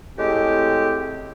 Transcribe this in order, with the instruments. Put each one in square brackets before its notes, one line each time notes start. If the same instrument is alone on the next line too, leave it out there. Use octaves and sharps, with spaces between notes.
[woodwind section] A2 G#3 C4 G4